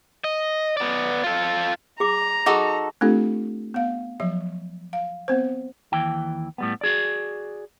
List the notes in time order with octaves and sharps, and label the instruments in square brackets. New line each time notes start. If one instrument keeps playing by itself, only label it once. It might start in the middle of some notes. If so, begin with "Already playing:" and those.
[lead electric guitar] D#5
B3 D5
F4 A4
[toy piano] G#4 D6 [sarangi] A#5
[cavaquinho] D#4 F#4 A4 [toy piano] G#4 D6
[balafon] A3 C4 D4 F4 G4 A4
B3 F5
F3 F#3 E5
F5
B3 C4 C5
[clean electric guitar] D#2 E3 G5
A2 G3 B3
F#4 G#4 D5